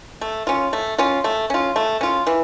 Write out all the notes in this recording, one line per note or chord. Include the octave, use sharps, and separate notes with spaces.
A3
C#4 F4
A3
C#4 F4
A3
C#4 F4
A3
C#4 F4
E3